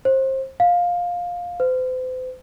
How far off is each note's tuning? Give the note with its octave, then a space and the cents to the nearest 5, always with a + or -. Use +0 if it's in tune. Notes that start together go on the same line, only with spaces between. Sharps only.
C5 +25
F5 +15
C5 -40